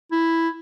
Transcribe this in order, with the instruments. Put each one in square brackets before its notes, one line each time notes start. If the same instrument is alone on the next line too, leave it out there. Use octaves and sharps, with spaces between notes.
[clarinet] E4